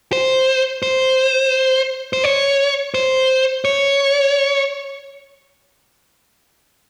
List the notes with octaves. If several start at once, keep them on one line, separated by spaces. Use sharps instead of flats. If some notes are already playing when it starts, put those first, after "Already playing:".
C5
C5
C5
C#5
C5
C#5